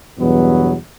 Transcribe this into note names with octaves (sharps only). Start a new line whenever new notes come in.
E2 G2 B2 F#3 B3